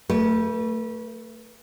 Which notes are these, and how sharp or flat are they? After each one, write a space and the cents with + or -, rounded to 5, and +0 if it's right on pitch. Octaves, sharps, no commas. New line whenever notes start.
A3 +25 B4 -25